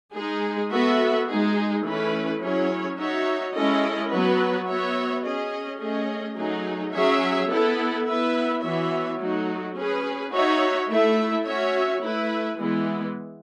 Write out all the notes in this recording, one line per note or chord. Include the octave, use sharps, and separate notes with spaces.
G#3 D#4 G#4
B3 F#4 A4 E5
G#3 D#4 G#4
E3 A3 C#4 E4 B4
F#3 C#4 E4 G#4 C#5
D#4 F#4 C#5 E5
G#3 C#4 E4 A4 D#5
F#3 B3 F#4 B4
B3 F#4 C#5 E5
C#4 G#4 D#5
A3 C#4 G#4 D#5
F#3 A3 D#4 G#4
F#3 C#4 G#4 C#5 E5
B3 E4 A4
B3 E4 B4 E5
E3 B3 F#4 C#5 E5
F#3 A3 D#4 F#4
C#4 G#4 B4
D#4 F#4 C#5 E5
A3 E4 A4 E5
C#4 F#4 C#5 E5
A3 E4 B4 E5
E3 G#3 B3 E4